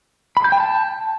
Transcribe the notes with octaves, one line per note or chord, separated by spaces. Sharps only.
B5
G6
G5
A5